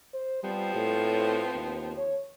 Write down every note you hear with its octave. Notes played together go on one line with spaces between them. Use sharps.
C5
F3 G3 B3 C4
A2
D#2
C#5